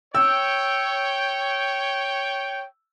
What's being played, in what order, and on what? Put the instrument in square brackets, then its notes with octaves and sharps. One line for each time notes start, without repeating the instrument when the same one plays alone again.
[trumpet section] C#5 G5 [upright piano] E6